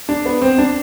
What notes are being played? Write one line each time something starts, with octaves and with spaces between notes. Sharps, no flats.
D4
B3
C4
D4